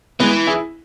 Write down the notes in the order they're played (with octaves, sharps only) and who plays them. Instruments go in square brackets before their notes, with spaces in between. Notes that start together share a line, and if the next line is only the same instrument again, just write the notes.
[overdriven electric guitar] E3 [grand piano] G#3 B3
[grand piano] E4 G#4